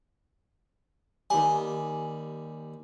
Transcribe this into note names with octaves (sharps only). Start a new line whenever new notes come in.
D#2 G3 G#5